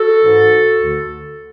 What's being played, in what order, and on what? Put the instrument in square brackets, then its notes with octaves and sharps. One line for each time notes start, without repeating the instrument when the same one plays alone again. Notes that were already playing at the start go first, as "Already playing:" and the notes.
Already playing: [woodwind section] F#4 A4
G#2 E3
D2 D3